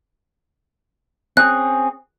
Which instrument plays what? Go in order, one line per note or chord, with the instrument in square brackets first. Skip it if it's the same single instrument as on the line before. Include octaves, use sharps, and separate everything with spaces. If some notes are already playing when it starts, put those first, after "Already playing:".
[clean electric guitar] C4 C#4 G#4 [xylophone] F#6